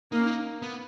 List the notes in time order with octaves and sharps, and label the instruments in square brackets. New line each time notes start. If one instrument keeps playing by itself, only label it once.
[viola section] A#3 [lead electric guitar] D#4
[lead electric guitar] C#4
D#4
B3